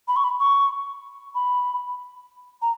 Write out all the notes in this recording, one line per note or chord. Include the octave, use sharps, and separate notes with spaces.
B5
C#6
B5
C#6
B5
A#5